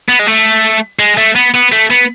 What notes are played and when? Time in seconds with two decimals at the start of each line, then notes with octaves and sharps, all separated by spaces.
0.09 B3
0.19 G#3
0.27 A3
0.99 G#3
1.18 A3
1.36 B3
1.54 B3
1.72 A3
1.90 B3